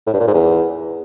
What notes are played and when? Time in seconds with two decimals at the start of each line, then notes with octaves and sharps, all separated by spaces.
0.06 A2
0.13 G2
0.20 A#2
0.27 G#2
0.34 E2